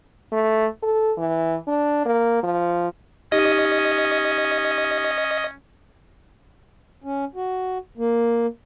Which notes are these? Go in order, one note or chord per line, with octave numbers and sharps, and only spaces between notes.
A3
A4
E3
D4
A#3
F3
C#4 D#4 G4 D#5 D#7
C#4
F#4
A#3